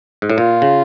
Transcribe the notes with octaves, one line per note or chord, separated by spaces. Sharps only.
G#2
A2
A#2 F4
C#3